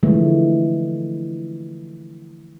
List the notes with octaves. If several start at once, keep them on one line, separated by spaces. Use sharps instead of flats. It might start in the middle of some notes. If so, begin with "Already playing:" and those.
D3 E3 F3 G#3 A3